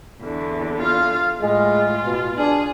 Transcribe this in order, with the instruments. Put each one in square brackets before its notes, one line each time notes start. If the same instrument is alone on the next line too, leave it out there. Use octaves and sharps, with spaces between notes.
[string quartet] E2 D3
[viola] F4 F5
[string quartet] A2 [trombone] G#3 [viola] F4
[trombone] B2
[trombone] D4 [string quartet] G#4